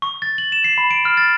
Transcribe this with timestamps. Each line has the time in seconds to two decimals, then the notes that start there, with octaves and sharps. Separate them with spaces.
0.02 C#6
0.22 A6
0.38 F#7
0.52 E7
0.64 C7
0.78 B5
0.91 D7
1.05 F6
1.17 A6